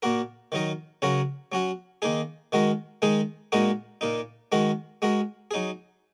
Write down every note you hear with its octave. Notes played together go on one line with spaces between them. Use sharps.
A#2 A#3 F#4 A#4
D#3 F#3 D#4 A#4
C#3 F#3 C#4 F#4 A#4
F#3 C#4 F#4
D#3 A#3 D#4 G#4
D#3 G#3 F#4 A#4
D#3 G#3 D#4 G#4
A#2 G#3 D#4 F#4 A#4
A#2 A#3 D#4
D#3 G#3 F#4 A#4
G#3 F#4 A#4
F#3 D#4 G#4